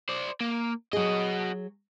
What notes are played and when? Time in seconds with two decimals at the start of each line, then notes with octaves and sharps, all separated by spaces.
0.09 C5 D5
0.41 A#3
0.93 F#3 F#4 G#4 D#5